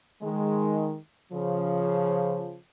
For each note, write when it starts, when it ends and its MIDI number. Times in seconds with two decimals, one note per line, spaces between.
0.21 0.96 51
0.21 0.96 56
1.31 2.57 49
1.31 2.57 53